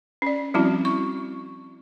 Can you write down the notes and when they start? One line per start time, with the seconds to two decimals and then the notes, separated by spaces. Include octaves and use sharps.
0.22 C#4 D5
0.54 F3 G3 C4 C#4 E4 F#4
0.85 C#6